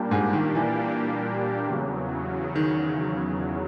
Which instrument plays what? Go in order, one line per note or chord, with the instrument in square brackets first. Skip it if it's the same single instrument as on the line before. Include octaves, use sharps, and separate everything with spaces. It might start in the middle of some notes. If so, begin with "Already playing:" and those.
Already playing: [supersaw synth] A#2 G3 A#3 D4 G4
[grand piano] G#2 G#3
D#3
E3
[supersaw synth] E2 C#3 F#3
[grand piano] D#3